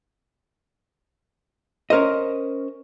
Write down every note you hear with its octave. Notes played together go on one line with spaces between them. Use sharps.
C#4 A#4 C5 D#5